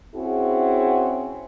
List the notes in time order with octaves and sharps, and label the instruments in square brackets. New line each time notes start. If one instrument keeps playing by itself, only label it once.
[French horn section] C4 C#4 E4 F#4 G#4